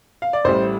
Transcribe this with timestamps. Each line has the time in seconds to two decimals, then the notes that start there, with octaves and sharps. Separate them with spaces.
0.22 F5
0.33 D5
0.44 A1 A2 G3 C5